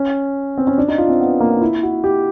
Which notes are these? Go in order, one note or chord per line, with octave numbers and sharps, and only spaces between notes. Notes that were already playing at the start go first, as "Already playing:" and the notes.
Already playing: C#4
C4
C#4
D4
D#4
F4
C4
B3
A#3
F4
E4
F#4
G4